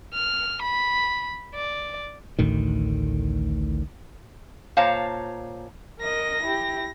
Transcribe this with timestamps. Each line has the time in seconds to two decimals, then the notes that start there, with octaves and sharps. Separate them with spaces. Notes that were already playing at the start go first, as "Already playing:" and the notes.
0.14 F6
0.62 B5
1.55 D5
2.39 A1 D2 A2 D#3
4.77 A#2 C5 C#5 F5 A5 A#5
6.01 A#4 D#5 A#6
6.43 E4 G4